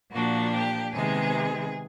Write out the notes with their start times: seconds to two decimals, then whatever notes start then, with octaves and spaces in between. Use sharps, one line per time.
0.12 A#2 F3 A#3 D4 F#4
0.54 G4
0.95 C3 D#3 G#3 B3 G#4